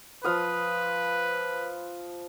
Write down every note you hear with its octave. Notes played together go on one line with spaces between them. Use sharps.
F3 B4 F5 D#6